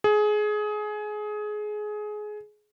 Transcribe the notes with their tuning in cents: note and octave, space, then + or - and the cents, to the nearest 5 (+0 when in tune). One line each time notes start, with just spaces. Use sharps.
G#4 +20